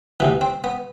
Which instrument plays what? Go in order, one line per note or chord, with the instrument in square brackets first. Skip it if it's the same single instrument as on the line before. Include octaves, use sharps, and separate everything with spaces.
[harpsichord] D2 C3 E3 B3
C4
B3